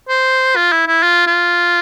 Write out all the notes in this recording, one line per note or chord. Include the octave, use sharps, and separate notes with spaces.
C5
F4
E4
E4
F4
F4